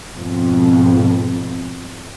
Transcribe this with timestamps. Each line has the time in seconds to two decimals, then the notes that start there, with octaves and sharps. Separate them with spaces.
0.16 F2 G#2 B2